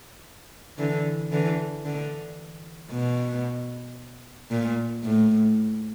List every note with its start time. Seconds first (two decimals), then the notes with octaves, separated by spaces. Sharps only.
0.78 D3 E3
1.32 D3 E3
1.85 D3
2.91 B2
4.50 A#2
5.03 A2